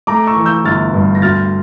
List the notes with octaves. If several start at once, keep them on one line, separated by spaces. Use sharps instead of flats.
A3 A#5 D6
C#6 E6
E3
E6 G6
G1 F6 A6
G2
A#6
D2 F6 A6